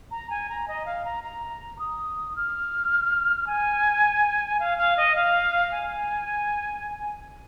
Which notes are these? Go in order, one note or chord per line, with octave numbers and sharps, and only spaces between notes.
A#5
G#5
A#5
D#5
F5
A#5
A#5
D#6
F6
G#5
F5
F5
D#5
F5
G#5